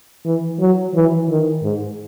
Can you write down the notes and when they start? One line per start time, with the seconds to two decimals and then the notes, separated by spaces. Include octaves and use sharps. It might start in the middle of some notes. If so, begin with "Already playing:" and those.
0.25 E3
0.60 F#3
0.94 E3
1.29 D#3
1.63 G#2